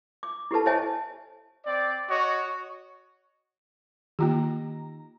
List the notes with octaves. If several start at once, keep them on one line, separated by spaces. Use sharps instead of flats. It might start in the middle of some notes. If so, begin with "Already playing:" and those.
D6
E4 G4 A4 B4 A5
C5 C#5 D#5 E5 G#5 A5
C4 D5
F#4 C#5 D#5
D#3 A#3 F4 G4 A#5